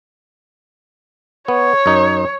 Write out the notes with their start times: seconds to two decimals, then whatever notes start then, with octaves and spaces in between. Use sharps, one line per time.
1.48 B3 C#5
1.86 F#2 D#4